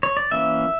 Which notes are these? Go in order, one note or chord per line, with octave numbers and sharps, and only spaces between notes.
C#5
D5
E3 A#3 C#4 E5